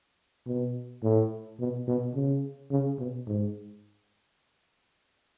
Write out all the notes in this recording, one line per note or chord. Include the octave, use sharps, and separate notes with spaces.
B2
A2
B2
B2
C#3
C#3
B2
G#2